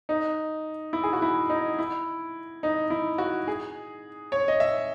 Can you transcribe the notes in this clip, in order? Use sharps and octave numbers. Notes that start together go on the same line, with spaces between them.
D#4
E4
G#4
F#4
E4
D#4
E4
D#4
E4
F#4
G#4
C#5
D#5
E5